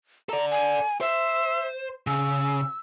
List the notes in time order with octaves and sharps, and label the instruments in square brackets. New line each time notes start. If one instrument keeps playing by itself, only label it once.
[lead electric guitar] A4 D5 [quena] A#5
[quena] G#5
[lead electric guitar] C5 [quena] E5
[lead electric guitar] C#3 [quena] E6